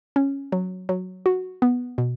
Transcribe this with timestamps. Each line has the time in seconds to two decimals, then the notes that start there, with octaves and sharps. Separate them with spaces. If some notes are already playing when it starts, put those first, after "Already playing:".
0.16 C#4
0.52 F#3
0.89 F#3
1.26 F#4
1.62 B3
1.98 B2